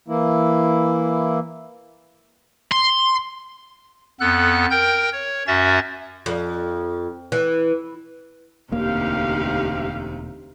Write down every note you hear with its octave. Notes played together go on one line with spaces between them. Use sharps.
E3 A#3 E4
C6
F2 B3 A4 F#6
A#4 G5 G6
C#5
F#2 C#4 F#4 E5 A6
F2
E3
E1 D2 C3 A#3 D#4 G4 F5